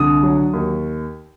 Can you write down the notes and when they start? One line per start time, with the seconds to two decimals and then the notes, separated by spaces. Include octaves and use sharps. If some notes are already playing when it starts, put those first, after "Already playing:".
Already playing: C2 D3 D#6
0.23 F#3
0.53 D#2